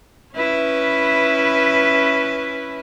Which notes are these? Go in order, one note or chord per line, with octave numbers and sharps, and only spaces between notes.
C#4 E4 B4